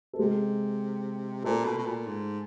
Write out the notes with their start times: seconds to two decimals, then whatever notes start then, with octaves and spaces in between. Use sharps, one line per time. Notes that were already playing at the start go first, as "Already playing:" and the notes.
0.13 A4
0.19 C3 G#3 G#4
1.44 A#2 A3 A4
1.65 B2
1.78 B2
1.86 A#2
2.07 G#2